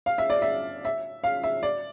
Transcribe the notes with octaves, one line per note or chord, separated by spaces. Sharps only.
F5
E5
D5
E5
E5
F5
E5
D5